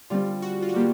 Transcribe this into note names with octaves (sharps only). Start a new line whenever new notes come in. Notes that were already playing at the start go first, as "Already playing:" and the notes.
D3 G3 C4 F4
F#4
F4
F#4
D3 G3 A#3 G4